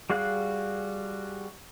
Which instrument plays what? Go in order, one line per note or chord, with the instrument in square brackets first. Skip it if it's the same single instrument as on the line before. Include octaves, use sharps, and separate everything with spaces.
[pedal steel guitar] G3 F#4 G#4 F5 F#6